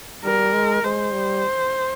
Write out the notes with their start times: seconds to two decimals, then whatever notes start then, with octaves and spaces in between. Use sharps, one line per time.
0.24 G3 A#4
0.53 G#3
0.83 G#3 C5
1.13 G3